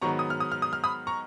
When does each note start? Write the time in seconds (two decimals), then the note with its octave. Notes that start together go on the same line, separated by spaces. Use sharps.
0.02 G#2 D#3 F#3 B3 A#5 C#6
0.19 D#6
0.30 F6
0.40 D#6
0.52 F6
0.62 D#6
0.73 F6
0.84 B5 D#6
1.07 A#5 C#6